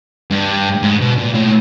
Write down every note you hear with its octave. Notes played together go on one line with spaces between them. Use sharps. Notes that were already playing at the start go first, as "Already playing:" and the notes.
G2
G#2
B2
A#2
A2